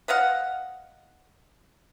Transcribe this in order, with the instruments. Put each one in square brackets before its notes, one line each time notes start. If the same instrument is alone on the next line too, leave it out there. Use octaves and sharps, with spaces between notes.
[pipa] B4 D#5 F5 F#5